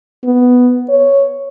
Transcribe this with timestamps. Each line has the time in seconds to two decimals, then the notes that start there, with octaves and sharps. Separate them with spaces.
0.24 B3
0.89 C#5